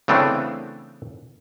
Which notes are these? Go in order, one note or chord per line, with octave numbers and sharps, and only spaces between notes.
C#3 E3 A3 B3 C4 D4